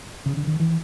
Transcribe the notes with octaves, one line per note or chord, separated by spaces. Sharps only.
C#3
D3
D#3
E3